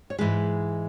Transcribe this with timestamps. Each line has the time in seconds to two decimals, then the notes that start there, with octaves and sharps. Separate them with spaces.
0.10 C#5
0.18 G#2 E3 G#3 B4